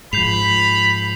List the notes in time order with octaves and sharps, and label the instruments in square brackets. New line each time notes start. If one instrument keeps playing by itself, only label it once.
[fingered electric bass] G#2 F3 [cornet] B5 [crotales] G6 C7 F7